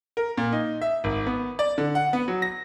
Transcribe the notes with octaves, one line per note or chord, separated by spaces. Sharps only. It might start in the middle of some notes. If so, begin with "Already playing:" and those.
A#4
A#2
D#4
E5
G#1
B3
D5
D3
F#5
B3
F#3
A#6